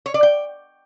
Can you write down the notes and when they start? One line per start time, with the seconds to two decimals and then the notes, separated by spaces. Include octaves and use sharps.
0.06 C#5
0.14 D5
0.23 G5